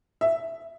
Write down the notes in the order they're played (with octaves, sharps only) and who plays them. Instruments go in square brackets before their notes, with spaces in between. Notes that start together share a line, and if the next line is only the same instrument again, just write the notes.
[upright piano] E5